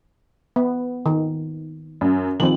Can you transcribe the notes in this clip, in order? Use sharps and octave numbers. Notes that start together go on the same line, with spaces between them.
B3
D#3
F#2
D#3 F3 C4 F#7